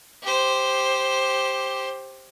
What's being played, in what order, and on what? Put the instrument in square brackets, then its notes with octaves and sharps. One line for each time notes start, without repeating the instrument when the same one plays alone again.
[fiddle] G4 C5